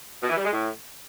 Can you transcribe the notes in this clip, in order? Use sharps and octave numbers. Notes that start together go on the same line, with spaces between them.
B2
E3
G3
G#3
A2